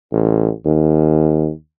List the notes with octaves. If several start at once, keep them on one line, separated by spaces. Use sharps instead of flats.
A1
D#2